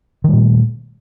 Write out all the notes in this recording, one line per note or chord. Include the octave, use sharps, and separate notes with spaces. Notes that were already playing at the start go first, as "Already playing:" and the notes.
A#2 D#3 G3 A3